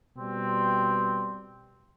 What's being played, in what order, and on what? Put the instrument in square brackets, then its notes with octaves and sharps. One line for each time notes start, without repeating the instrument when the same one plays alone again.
[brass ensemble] B2 G3 C4